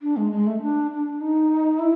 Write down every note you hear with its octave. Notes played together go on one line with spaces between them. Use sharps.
D4
G#3
G#3
A3
D4
D4
D#4
E4